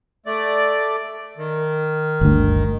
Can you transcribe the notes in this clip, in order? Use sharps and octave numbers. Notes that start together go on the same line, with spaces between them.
A3 D5
D#3
G1 D2